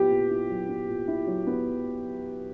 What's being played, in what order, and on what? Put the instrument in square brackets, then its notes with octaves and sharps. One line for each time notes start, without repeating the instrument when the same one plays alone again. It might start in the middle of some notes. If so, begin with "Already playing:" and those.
Already playing: [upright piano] A#2 F#3 B3 E4 [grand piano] G4
[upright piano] A#2
E4
F#3
B3
A#2
E4
F#3
B3